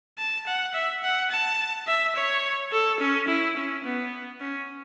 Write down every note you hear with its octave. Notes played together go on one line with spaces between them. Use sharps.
A5
F#5
E5
F#5
A5
E5
C#5
A4
C#4
E4
C#4
B3
C#4